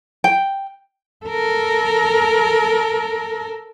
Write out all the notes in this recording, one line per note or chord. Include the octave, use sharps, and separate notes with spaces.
G5
A4 A#4